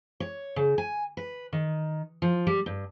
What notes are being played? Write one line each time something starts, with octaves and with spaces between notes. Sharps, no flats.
C#5
C#3
G#5
B4
D#3
F3
G3
G2